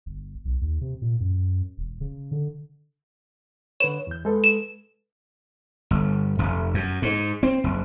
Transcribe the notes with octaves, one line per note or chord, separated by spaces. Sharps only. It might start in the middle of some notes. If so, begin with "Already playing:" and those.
G1
B1
D#2
C3
A#2
F#2
E1
C#3
D3
D3 B4 C#5 E7
E2 G6
G#3 A4 B4
E7
G1
F1
F#2
G#2
C4
F#1